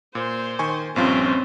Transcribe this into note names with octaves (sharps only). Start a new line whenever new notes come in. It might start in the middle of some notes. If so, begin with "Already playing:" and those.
A#2 C5
D#3 G#5 C#6
A#1 G2 C4 C#4 F4